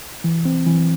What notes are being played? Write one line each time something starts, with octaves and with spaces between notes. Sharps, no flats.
E3
C4
E3